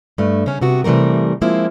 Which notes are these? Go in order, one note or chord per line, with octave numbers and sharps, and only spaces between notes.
G2 A3
C#3 C#4
C3 B3 F#4
C3 E3 G3 A3 A#4
F3 G#3 A#3 C4 E4